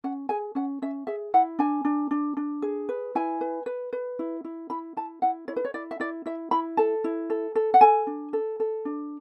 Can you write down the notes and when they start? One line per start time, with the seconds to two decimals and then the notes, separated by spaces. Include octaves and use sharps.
0.04 C#4 F#5
0.29 G#4 G#5
0.55 C#4 F#5
0.82 C#4 E5
1.07 G#4 E5
1.34 E4 F#5
1.59 D4 G#5
1.85 D4
2.11 D4
2.37 D4
2.62 G#4
2.89 B4
3.15 E4 G#5
3.41 B4
3.66 B4
3.93 B4
4.19 E4
4.44 E4
4.70 E4 B5
4.97 E4 A5
5.22 E4 F#5
5.48 E4 C#5
5.56 B4
5.65 C#5
5.74 E4 D5
5.91 E5
6.00 E4 D5
6.26 E4 E5
6.51 E4 B5
6.77 A4 A5
7.04 E4
7.30 A4
7.55 A4
7.74 F#5
7.81 A4 G#5
8.07 D4
8.33 A4
8.60 A4
8.85 D4